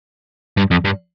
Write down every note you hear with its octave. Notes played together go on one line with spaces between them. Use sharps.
G2
F2
G2